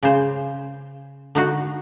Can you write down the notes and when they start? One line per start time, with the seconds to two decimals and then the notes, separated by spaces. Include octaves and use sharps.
0.03 C#3 C5
1.35 D3 D#4 F#4